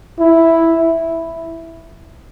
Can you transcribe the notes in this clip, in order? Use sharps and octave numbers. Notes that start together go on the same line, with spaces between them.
E4